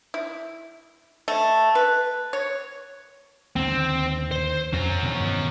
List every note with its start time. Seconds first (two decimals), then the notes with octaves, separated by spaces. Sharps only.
0.14 E4
1.28 A3
1.75 B4
2.33 C#5
3.56 D#2 D3 C4
4.31 C5
4.73 F2 C#4 A#5
5.03 B2 D#3 E3